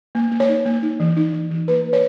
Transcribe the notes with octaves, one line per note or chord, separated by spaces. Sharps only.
A#3
A#3
C#5
D#4
A#3
D#4
E3
D#4
E3
E3
A#3 B4
A#3
C#5